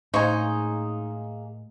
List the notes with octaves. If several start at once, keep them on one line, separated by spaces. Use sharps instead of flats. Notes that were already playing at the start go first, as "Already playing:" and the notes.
A2 C#3 G#3 A#3 D#4 C5 G#5 C#6